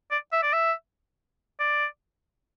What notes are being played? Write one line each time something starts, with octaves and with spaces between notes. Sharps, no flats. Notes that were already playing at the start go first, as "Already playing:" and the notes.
D5
E5
D5
E5
D5